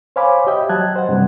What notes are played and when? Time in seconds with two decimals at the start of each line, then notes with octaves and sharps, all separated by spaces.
0.16 C5 C#5 F5 G#5 B5 D6
0.47 G4 D#5 E5 G5
0.69 F#3 D#5 A5 F#6 G#6
0.96 C5 F#5
1.09 G2 C3 G3